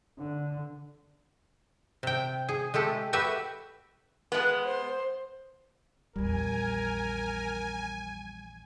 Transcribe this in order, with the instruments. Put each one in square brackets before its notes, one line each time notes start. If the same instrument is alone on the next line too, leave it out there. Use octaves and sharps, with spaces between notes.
[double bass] D3
[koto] C3 G5
G#4
G#3 A3 G4 A4
F#4 G4 B4 E5
[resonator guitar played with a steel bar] G#3 B3
[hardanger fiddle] C5
[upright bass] A#1 E2 [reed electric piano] G3 [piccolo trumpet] A#4 [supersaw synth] G#5